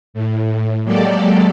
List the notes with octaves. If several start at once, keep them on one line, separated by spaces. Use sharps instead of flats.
A2
F#3 G#3 A#3 G4 A4 D5